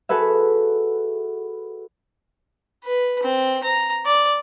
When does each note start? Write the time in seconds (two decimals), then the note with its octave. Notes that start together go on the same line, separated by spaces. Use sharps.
0.09 F#4 G#4 A4 B4 E5
2.84 B4
3.24 C4
3.64 A#5
4.06 D5